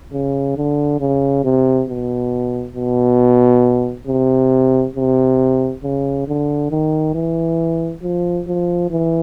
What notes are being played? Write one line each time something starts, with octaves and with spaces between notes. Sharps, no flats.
C#3
D3
C#3
C3
B2
B2
C3
C3
C#3
D3
D#3
E3
F3
F3
E3